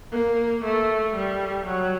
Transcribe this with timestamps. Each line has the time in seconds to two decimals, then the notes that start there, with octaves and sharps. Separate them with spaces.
0.12 A#3
0.64 A3
1.15 G3
1.66 F#3